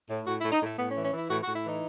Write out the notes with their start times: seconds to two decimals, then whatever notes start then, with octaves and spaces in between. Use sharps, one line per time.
0.09 A2
0.26 A2 F#4
0.39 A2 E4
0.52 D#4
0.61 A2 A3
0.77 A2 B3
0.91 C#4
0.95 E3
1.03 C#4
1.13 E3 E4
1.29 A2 F#4
1.43 F#4
1.47 A2
1.55 E4
1.64 E3 D#4